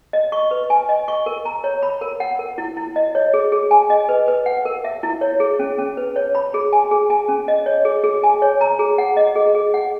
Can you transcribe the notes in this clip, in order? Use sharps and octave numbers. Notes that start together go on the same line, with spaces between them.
D#5
C#6
B4
G#5
D#5
C#6
A#4
A#5
C#5
B5
A#4
F#5
A#4
E4
E4
D#5
C#5
G#4
G#4
G#5
D#5
B4
B4
F#5
A#4
E5
E4
C#5
G#4
C#4
C#4
B4
C#5
B5
G#4
G#5
G#4
G#5
C#4
D#5
C#5
G#4
G#4
G#5
C#5
A#5
G#4
F#5
D#5
G#4
G#4
F#5